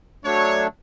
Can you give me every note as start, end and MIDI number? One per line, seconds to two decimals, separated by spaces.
0.25 0.67 54
0.25 0.67 57
0.25 0.67 62
0.25 0.65 73